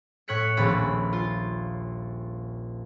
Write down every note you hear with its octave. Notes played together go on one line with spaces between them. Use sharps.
A2 C#5 F#6 B6 C#7
D#1 A#1 B5
F4